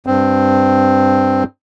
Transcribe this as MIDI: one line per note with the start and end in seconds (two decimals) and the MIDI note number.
0.07 1.44 43
0.07 1.44 60